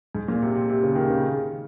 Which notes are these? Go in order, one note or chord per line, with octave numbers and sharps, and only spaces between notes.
G#2
A#2
C3
C3
C3
C#3
D#3
C#3